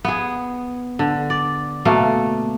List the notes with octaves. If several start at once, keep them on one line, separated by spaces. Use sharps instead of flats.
B3 G#4
D3
D5
B2 A3 A#3 F5